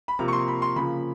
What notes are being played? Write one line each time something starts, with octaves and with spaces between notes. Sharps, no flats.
B5
C3 F3 A#3 A#5
C#6
C6
B5
C6
C#3 F3 A#3 B5